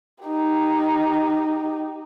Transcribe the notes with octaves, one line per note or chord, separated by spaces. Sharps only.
D#4 G4